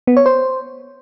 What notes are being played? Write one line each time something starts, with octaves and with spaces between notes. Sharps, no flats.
B3
C#5
C5